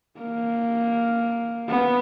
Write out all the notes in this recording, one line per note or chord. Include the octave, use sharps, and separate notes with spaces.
A#3
B3